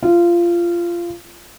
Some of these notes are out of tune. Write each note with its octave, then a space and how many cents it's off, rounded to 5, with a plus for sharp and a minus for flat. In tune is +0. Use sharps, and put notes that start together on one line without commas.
F4 -20